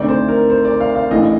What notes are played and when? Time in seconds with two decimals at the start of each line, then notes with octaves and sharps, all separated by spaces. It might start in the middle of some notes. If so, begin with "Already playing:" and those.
Already playing: D2 D3 A3 C4 D#4 D5
0.08 C5
0.28 A#4
0.50 C5
0.65 D5
0.80 F5
0.95 F5
1.10 A1 A2 A3 D4 D#5